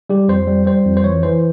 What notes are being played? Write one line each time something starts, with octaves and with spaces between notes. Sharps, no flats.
G3 G4
F2 C5
G3
G3 C5
F2
C5
E3 C#5
E3 C5